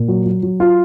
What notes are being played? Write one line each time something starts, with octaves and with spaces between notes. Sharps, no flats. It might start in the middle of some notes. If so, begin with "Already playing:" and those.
Already playing: A#2
F#3
F#3
F#3
F4